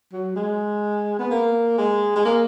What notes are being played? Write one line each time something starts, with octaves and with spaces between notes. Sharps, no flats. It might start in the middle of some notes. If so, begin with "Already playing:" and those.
F#3
G#3
B3
A#3
G#3
G#3
A#3